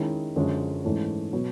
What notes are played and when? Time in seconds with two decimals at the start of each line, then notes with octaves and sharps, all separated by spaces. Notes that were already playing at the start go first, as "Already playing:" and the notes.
Already playing: D#3 G#3 C#4 E4
0.36 F#2 D3 F3 G#3 C#4
0.84 G#2 E3 A3 C#4
1.32 B2 F#3 B3